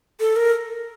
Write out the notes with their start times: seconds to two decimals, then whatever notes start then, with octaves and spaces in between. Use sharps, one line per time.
0.20 A4
0.36 A#4